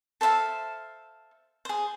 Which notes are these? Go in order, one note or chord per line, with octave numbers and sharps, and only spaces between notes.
A4 C5 E5 F5
G#4 C5